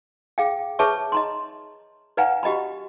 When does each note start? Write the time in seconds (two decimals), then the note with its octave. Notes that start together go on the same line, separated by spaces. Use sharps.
0.38 G#4 F5 G5
0.79 G#4 B4 C#5 E5 A5 C#6
1.12 D#5 A#5 C6
2.17 B4 D5 F5 F#5 G#5 A#5
2.43 F#4 G4 D#5 A#5 B5